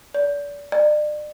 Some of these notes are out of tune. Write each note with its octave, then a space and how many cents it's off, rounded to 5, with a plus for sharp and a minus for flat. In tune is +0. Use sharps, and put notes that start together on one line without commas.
D5 -35
D5 +35